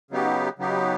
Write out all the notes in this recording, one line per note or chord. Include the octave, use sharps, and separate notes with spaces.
C#3 F#3 B3 D#4 G4
C#3 F#3 B3 D#4 G4